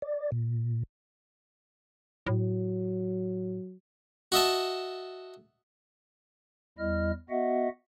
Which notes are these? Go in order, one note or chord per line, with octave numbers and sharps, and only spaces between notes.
D5
A#2
A2 F#3
F#4 D#5 E5 A5
E2 G3 E4 D#5 F6
B3 F#4 D#5 E5 F#5